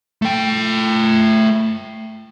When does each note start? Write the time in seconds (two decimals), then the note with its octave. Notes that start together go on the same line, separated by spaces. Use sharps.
0.22 A3 G5